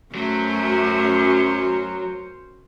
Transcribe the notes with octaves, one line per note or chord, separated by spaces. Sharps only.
F#2 F#3 A3 C#4 C5